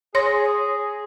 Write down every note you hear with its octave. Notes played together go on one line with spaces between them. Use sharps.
G#4 C#5 C6 A#6